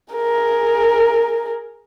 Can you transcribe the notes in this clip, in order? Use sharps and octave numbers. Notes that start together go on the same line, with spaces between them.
G#4 A#4